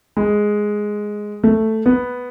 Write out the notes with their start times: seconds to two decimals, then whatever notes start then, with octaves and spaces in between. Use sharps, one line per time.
0.17 G#3
1.43 A3
1.86 B3